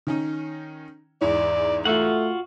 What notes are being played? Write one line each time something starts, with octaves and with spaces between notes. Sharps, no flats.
D#3 C#4 D#4
E2 G#2 E3 D5
A3 F4 F#4 F#5